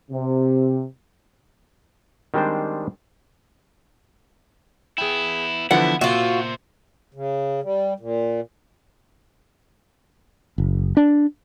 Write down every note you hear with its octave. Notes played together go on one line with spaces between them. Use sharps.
C3
D#3 G3 G#3 C4 D4 C5
B3 E4 G#4 G5
D3 E3 F3 B3 E4 F#5
A#2 F4 F#4 C5 E5
C#3
G3
A#2
F#1
D4